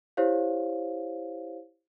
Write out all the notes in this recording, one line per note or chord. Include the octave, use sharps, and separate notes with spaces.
E4 G4 C5 C#5 F5